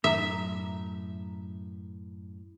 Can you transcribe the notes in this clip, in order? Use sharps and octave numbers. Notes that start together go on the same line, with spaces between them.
F#2 A2 E5 A#5